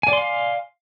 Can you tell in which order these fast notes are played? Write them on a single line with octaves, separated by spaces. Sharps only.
G#5 D5 C6 F5